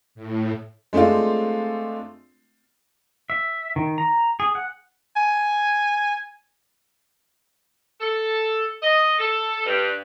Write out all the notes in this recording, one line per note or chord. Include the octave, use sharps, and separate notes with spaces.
A2
G#3 A3 C4 D4 F4
E5
D#3
A#5
G#4
F#5
G#5
A4
D#5
A4
G2